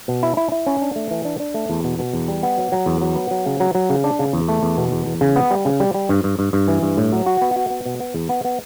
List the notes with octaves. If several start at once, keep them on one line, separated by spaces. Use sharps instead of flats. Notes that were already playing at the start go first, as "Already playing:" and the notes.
B2
E4
E4
E4
C#4
D4
A3
E3
D4
D4
A3
E2
B2
B2
E2
G3
B3
F#3
F#3
E2
F#3
B3
F#3
C#3
F#3
F#3
C#3
D4
C#3
E2
A3
E2
B2
E2
E2
C#3
B3
G3
C#3
G3
G3
G2
G2
G2
G2
E3
G2
A2
F#3
F#4
B3
F#4
B3
B2
B3
E2
B3
B3